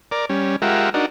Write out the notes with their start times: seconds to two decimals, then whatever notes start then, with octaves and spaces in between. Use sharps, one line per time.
0.12 A#4 D5
0.29 G3 C#4
0.62 G#3 F4 G4 A#4 E5 F#5
0.94 D4 D#4 F#4 A#4